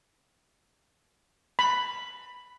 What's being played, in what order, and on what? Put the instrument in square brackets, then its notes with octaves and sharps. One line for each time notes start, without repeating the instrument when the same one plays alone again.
[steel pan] B5